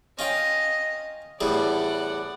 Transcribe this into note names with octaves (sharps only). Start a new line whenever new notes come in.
C#4 F4 D#5 G5
E2 A2 G3 D5 F#5